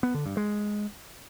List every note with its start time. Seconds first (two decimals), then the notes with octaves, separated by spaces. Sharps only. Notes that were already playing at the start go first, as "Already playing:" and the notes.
0.03 B3
0.14 D3
0.26 G2
0.37 G#3